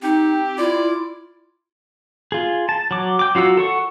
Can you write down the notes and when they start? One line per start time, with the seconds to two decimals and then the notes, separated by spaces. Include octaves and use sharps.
0.02 C4 D#4 G4
0.58 E4 F4 D5
2.32 F4 G#4
2.69 A5
2.91 F#3 D6
3.19 G5 D6
3.35 F#3 F4 F#4 E6
3.57 A4 F#5 C#6